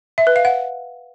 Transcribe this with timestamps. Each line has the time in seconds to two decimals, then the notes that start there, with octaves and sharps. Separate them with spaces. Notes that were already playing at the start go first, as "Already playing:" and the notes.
0.18 E5
0.27 B4
0.36 F5
0.45 F#5